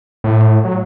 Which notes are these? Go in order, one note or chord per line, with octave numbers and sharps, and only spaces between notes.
A2
F#3